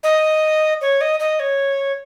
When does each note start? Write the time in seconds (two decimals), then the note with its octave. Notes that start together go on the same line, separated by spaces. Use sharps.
0.03 D#5
0.81 C#5
1.01 D#5
1.20 D#5
1.39 C#5